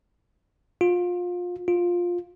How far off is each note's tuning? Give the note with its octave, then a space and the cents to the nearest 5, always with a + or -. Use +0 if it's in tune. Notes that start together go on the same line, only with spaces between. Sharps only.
F4 +25
F4 +10